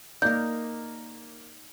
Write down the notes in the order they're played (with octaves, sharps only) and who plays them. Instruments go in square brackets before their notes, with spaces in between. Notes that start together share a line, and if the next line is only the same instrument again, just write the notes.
[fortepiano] A#3 D5 [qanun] D#4 A#4 [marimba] G6